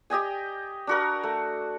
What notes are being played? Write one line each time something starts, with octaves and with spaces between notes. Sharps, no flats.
G4 D#5 G5 G#5
D4 F#4 A#4
A3